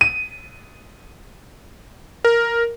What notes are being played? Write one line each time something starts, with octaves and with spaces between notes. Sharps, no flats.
D#7
A#4